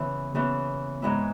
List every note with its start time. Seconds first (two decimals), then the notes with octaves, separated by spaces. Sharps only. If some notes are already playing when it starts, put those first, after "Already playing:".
Already playing: C#3 E3 B3
0.35 C#3 E3 B3
1.02 G#2 G#3 B3 E4